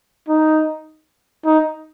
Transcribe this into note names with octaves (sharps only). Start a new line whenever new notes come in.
D#4
D#4